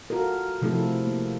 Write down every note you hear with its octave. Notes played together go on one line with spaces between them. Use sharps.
F4 F#4 A4 A#4
C3 F3 A3 E4 A4
A#3